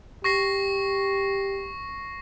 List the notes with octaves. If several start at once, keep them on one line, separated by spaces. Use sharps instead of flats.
G4 C#6 A#6 C7